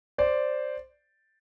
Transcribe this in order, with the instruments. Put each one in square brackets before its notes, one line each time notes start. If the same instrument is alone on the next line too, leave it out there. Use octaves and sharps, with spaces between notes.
[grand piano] C5 D5